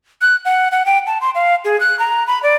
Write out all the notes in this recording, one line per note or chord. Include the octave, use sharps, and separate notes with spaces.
F#6
F#5
F#5
G5
A5
C6
F5
G#4
F#6
A#5
B5
D5